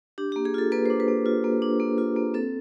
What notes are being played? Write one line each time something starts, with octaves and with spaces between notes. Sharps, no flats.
D4 G4
G4
A#3
G#4
F4 A4
A#3 B4
C5
D4
B4
A#3
F4
A#3
D4
A#3
F4
A#3
C4 A4